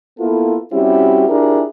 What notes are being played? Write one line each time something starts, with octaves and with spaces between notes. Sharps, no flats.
A#3 B3 E4 F4 A4
G3 C4 C#4 E4 F#4 G4
D4 E4 F4 G4 G#4 A#4